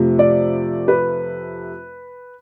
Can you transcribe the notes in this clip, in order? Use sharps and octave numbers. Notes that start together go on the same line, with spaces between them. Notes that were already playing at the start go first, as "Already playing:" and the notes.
Already playing: F2 C3 F3 A3
D5
B4